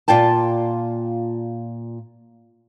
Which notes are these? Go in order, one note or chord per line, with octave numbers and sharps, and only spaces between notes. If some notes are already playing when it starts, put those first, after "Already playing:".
A#2 F4 D5 G5 A5